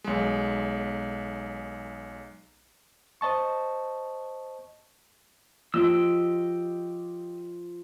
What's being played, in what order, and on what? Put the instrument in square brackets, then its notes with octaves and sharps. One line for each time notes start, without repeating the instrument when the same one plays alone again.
[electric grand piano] B1 G#3
[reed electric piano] C5 D#5 A5 C#6
[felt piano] F3 [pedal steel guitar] G4 D#5 E6